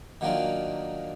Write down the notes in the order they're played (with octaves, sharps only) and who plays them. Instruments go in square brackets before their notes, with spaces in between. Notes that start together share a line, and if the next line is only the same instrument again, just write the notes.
[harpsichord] D#3 F#3 A#3 D4 F4